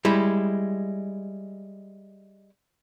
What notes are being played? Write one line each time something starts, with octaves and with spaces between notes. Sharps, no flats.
G3 G#3 E4